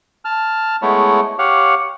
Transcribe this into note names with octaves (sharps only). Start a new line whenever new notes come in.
A5 F6
G#3 A3 B3 E4 C#5
G4 C#5 F5 F#5